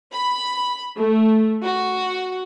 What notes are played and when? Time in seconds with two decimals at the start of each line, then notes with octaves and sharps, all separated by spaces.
0.12 B5
0.98 A3
1.65 F#4